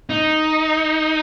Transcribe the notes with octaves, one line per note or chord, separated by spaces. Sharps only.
D#4